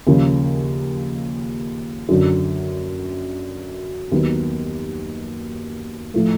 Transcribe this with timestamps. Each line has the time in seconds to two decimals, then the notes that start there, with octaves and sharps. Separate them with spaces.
0.07 D#2 C#3 F3 A#3 C#4
2.09 F#2 D3 F#3
4.12 D#2 D#3 F#3 B3
6.14 A2 F3 A3